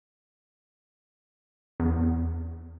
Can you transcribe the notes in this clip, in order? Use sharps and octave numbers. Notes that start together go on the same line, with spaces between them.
E2